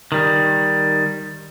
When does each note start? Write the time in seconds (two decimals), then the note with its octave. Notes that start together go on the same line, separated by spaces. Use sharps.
0.12 D#3 G3